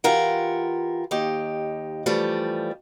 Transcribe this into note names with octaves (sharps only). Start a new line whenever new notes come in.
E3 F4 G4 A#4 F#5
D#2 D#4 G4
E3 F3 G3 A3